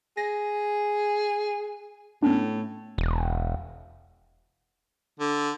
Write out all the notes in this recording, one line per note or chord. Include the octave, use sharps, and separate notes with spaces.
G#4 A#6
A2 B3 C#4 D4
E1
D3